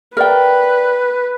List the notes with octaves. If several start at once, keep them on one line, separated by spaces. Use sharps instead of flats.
A#4 B4 D5 G5